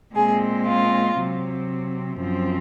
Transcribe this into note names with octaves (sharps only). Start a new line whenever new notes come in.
A#2 G#3 C4 G#4
F4
C3 F#3 C4
F#2 F3 C4